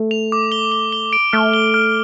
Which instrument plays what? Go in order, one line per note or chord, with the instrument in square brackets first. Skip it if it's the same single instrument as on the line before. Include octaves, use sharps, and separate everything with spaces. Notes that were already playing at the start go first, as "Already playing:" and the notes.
Already playing: [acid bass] A3
[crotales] F7
D6
G7
G7
G7
D7
[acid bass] A3 [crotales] F6
[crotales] G7
F6